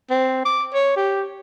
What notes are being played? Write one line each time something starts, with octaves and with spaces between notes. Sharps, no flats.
C4
D6
C#5
G4